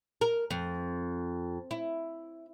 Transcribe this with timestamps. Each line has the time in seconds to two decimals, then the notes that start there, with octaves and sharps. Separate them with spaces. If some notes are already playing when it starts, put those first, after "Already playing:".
0.21 A#4
0.51 F2
1.71 E4